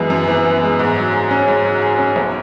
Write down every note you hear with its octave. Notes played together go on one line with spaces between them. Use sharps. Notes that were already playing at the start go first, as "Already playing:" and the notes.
Already playing: F#2 E3 G#3 B3
F#2
E3
B3
G#3
G#2
F#3
G#4
C#4
G#2
F#3
G#4
C#4
B1